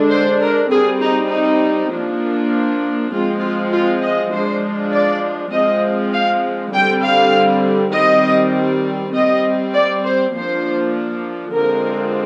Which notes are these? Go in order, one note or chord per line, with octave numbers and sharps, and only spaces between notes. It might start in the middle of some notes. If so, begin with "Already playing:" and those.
Already playing: D3 G#3 D4
C5
A#4
G3 C4 G#4
D#4
D#4
F3 A#3 D4
F3 G#3 C4 F4
F4
F4
D#5
F3 G#3 D4 C5
D5
F3 G#3 C4 D#5
F5
D3 G3 C4 G5
F5
D#3 G3 C4 D#5
G3 C4 D#5
D5
C5
F3 A#3 D4 C5
D3 F3 G#3 C4 A#4